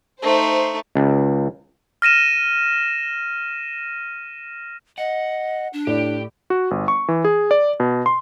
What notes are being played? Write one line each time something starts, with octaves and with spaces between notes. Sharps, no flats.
A3 D#4 C5
C#2
F6 A#6 D#7 E7
D#5 F#5
D4
A2 G4 D5
F#4
G1
C#6
E3
G#4
D5
B2
C6